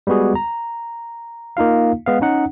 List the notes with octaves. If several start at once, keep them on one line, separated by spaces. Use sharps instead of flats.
G3 G#3 B3 F#4 G#4
A#5
A#3 D#4 F4 F5
G#3 B3 F5
C#4 D#4 F#5